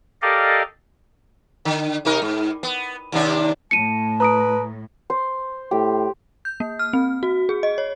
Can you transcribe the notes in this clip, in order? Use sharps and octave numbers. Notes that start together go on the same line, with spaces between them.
G4 A4 A#4 D5 D#5 F5
D3
C3 D#4 A#4
G#2
B3
D#2 C3 D4
A2 A5 C#7 D#7
B4 A#5 D#6 D7
C5
A2 G4
G6
A#3
F6
C4
F#4
G#4
D#5
C#5